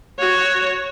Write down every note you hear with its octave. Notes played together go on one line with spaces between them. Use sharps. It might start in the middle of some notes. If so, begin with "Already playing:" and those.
F#4 C#5